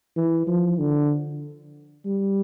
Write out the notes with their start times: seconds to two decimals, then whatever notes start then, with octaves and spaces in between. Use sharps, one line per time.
0.17 E3
0.47 F3
0.79 D3
2.06 G3